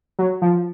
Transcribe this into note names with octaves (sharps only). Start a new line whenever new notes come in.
F#3
F3